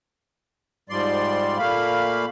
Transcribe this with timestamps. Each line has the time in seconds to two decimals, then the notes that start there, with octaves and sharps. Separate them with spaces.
0.90 G#2 F3 G3 D5 C6
1.58 A#2 A3 A#3 F5 B5